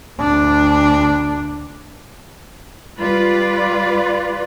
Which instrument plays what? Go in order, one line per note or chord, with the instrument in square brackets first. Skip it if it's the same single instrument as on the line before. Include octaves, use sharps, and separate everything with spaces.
[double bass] D2 D4
[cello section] G3 F4 B4 D5